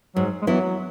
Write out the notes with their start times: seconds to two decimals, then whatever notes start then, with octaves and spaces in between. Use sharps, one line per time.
0.15 G#2 F#3
0.42 G#3
0.47 E3 F#3 B3 E4